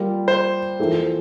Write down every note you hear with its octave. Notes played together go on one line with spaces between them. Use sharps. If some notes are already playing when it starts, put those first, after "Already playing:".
Already playing: G3 A#3 F4
C5
F2 E3 A#3 E4 A4